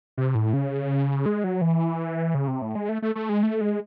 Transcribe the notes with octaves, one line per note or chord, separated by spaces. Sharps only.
C3
A2
C#3
G#3
F#3
E3
C#3
C3
A2
G#3
A3
A3
A3
G#3
A3
G#3